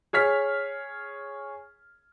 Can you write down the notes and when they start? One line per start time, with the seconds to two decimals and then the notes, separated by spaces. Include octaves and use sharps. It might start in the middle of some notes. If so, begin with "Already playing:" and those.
0.13 G#4 C#5 F6 B6